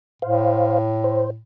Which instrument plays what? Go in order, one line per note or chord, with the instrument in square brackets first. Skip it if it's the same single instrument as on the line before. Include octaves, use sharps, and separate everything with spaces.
[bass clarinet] A2 [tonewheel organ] C5 F5
[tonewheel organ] C5